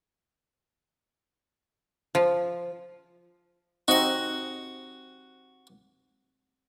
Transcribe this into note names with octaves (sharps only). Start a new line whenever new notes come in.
F3
C4 D#4 F#4 D#5 F#5